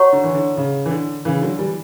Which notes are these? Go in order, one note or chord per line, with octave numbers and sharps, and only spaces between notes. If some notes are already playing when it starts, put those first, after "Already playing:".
Already playing: F#4 C#5 F#5 A#5 C#6
D3
E3
D3
C#3
E3
D3
C#3 E3
D3 F#3
E3 G3